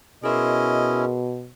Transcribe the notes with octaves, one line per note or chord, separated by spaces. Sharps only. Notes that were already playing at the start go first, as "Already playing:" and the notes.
B2 C#4 E4 G#4 A#4 D#5 C6